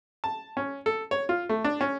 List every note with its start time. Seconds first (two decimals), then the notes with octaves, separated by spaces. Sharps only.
0.24 A5
0.57 C#4
0.86 A4
1.11 C#5
1.29 F4
1.49 A3
1.64 D4
1.81 C#4